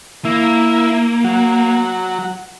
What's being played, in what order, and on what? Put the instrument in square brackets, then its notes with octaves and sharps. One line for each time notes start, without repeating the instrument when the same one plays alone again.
[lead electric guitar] A#3 [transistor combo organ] E4
[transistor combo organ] F#3